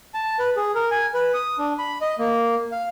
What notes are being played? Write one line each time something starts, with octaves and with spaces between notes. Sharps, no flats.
A5
B4
G#4
A#4
G#5
B4
D#6
D4
B5
D#5
A#3
F5